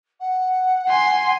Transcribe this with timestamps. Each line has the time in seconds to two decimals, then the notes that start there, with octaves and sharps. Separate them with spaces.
0.20 F#5
0.89 G#5 C6